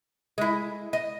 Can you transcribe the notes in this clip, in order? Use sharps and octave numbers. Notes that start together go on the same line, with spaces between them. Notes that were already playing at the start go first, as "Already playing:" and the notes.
G#3 E4
D#5